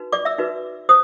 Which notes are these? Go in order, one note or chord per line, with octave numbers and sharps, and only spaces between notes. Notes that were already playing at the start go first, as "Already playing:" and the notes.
Already playing: D#4 F#4 B4
D5 D6
E5 E6
D#4 F#4 B4
C5 D#6